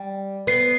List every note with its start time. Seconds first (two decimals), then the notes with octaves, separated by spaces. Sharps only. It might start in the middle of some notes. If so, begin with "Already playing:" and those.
Already playing: G3
0.47 B3 C7